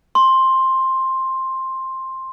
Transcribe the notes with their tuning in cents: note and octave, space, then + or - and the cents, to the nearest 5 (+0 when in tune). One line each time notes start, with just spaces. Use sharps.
C6 +10